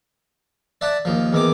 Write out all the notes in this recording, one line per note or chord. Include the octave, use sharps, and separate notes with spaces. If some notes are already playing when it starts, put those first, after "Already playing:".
D5 E5 F#5 A5
D#2 F3
E2 D#3 D6